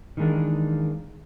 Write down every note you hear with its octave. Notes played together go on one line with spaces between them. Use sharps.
D#3 E3 G#3 A#3 D4